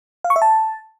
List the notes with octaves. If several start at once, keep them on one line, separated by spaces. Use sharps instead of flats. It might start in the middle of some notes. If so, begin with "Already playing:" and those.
F5
C#6
E5
A5